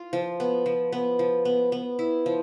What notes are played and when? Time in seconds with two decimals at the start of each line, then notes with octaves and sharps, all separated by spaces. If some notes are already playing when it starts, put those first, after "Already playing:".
Already playing: F4
0.13 F3
0.40 B3
0.66 F3
0.92 B3
1.19 F3
1.45 B3
1.72 B3
1.99 E4
2.26 F3